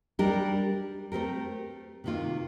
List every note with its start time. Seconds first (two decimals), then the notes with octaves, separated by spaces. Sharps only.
0.19 G3 D4 G4 A#4
1.12 A3 C4 G4 A#4
2.04 C3 D#3 A#3 F4